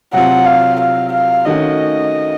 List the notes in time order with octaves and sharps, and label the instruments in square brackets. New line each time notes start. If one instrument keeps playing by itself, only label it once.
[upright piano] C3 F#3 C4 F4 [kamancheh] F#5
[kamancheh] F5
F5
F5
[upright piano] D#3 A3 C#4 F#4 [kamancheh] D#5